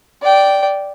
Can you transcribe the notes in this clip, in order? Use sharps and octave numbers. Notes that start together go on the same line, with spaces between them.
D5 G5